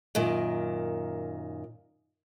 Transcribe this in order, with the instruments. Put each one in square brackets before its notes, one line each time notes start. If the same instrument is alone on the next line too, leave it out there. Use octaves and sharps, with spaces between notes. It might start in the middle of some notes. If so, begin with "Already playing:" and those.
[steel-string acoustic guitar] F#2 A#2 D#3